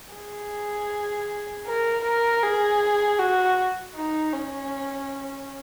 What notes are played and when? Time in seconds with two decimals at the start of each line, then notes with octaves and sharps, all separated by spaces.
0.14 G#4
1.66 A#4
2.04 A#4
2.43 G#4
3.19 F#4
3.95 D#4
4.33 C#4